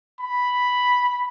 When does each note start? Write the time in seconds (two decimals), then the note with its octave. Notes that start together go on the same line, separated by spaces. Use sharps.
0.20 B5